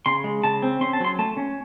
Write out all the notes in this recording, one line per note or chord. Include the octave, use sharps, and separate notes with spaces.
C#3 C6
G#3
C#3 A5
C4
C#4 C6
A5
F#3 C6
A3 A5
C#4